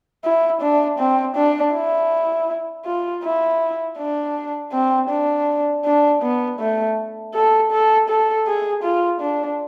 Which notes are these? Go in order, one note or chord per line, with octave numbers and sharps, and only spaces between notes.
E4
D4
C4
D4
E4
F4
E4
D4
C4
D4
D4
B3
A3
A4
A4
A4
G#4
F4
D4